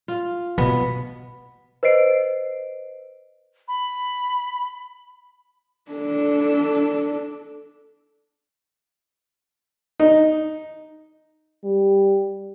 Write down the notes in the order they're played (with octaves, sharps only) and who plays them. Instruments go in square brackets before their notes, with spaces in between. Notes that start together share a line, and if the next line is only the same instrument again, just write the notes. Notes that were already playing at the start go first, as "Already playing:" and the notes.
[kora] F4
[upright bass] B2 [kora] B3
[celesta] B4 C5 D#5 C7 D7
[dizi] B5
[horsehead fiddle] D4 A4
[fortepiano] D#4
[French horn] G3